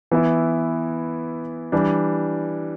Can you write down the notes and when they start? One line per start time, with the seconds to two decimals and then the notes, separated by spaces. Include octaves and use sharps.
0.11 E3 B3 E4
1.72 E3 G3 D4